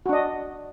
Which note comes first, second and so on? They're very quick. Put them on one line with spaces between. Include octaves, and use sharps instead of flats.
F#4 D4 D#5